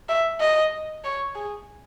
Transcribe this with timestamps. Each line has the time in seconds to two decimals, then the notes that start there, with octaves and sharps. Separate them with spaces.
0.09 E5
0.40 D#5
1.04 C#5
1.35 G#4